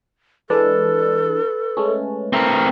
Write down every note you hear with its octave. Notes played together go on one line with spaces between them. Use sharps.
E3 G#3 D4 A4 B4 A6
G#3 A3 C#4
A3 C4 A#4 F6 C#7